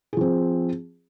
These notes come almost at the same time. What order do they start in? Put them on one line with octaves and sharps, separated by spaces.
G#4 F3 C4